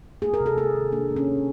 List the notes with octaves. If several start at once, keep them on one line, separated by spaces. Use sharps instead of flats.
A#3 G#4
A#4
C3
A4
A#3 G#4
D#3
A#3 D4
A#3
C#4
A#3